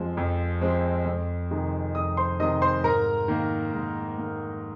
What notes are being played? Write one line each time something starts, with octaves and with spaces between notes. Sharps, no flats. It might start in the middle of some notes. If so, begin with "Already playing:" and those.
Already playing: F2 F3 G#3 C4
F2
F3 G#3 C4
F2
C3 D#3 G#3
F2 D#5 D#6
C5 C6
C3 D#3 G#3 D#5 D#6
C5 C6
G#2 A#4 A#5
D#3 A#3
G#2
D#3 A#3